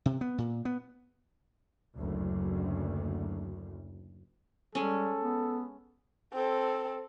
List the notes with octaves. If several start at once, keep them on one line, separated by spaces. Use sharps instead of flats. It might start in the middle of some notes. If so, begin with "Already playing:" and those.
C3
B3
A#2
B3
F#1 D2
G3 G#3 C#4 A4
B3
C4 A4